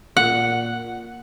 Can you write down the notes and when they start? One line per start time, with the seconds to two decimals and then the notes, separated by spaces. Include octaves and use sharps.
0.17 A#2 F#5